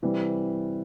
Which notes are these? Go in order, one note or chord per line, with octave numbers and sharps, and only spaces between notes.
C3 E3 G3